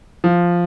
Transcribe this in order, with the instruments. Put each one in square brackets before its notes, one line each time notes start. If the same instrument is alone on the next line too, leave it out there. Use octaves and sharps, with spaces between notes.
[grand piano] F3